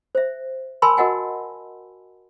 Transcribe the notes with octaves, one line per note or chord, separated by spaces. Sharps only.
C5 E5
A#4 G#5 A5 B5 C6 E6
F#4 A#4 D#5 F#5 G#5